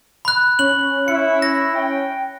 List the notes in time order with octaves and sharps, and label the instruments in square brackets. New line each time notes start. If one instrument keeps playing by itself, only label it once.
[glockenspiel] B5 F#6
[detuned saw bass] C#4 [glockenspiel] F#7
[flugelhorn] E4 [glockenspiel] C#7
[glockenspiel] A#6
[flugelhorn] G5